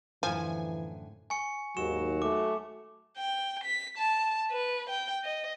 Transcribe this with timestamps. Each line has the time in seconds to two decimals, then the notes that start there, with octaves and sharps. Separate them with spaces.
0.23 F#2 A2 D3 E3 F3 G#5
1.30 G#5 C#6 C#7
1.77 D#2 G#2 F#3 C#6 E7
2.22 A3 D6
3.18 G5
3.64 B6
3.98 A5
4.51 B4
4.90 G5
5.24 D#5